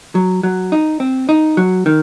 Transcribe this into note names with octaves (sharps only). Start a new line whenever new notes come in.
F#3
F#3
D#4
C4
D#4
F#3
D#3